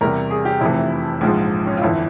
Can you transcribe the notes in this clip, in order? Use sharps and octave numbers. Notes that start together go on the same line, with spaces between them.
E2 C3 G3 A#4
G#4
G4
F1 F2 C3 E3 E4
A#1 G#2 F3 G#3
C#4
F4
G1 F2 E3 E4